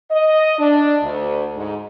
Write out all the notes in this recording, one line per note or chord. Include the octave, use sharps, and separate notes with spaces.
D#5
D4
D2
G#2